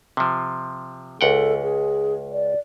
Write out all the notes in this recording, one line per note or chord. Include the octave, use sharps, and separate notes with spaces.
C3 F3
C#2 A4 F#5 G5
G#4
D5